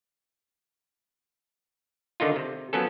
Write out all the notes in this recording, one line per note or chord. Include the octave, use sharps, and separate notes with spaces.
D3 D#3 D#4 F4
C3
F3 F#3 B3 C#4 A4